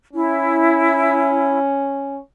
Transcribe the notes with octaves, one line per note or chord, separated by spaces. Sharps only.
C#4 E4